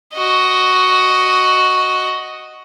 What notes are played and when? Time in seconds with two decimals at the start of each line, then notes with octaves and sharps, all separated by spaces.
0.15 F#4 D#5